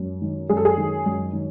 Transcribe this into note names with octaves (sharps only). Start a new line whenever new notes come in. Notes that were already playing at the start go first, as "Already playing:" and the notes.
Already playing: F#2
D#3
F#2 G#4
A4
G#4
D#3
F#2
D#3